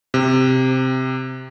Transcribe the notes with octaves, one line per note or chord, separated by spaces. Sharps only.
C3